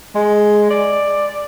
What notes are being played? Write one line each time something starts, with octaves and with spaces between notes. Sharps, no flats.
G#3
D5